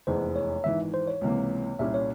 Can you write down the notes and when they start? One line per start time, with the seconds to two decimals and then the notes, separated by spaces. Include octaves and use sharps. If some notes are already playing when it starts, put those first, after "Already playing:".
0.07 F1 E2 E3 G#3 C5
0.36 C#5
0.64 G#1 G#2 E3 E5
0.94 C5
1.07 C#5
1.21 C#2 C3 E3 A#3
1.79 C2 A#2 G3 C#4 E5
1.94 C#5